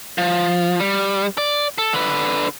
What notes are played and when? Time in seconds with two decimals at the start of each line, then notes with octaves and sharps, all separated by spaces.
0.18 F3
0.80 G3
1.38 D5
1.78 A4
1.94 D3 B4